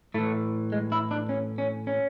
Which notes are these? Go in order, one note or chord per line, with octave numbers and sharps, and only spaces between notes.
A2 E3 A3
G#3
E4
D4
C#4
C#4
C#4